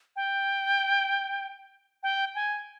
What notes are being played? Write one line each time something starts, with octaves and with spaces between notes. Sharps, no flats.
G5
G5
G#5